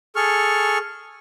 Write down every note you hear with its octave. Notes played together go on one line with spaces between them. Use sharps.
G#4 A4 C#6 F6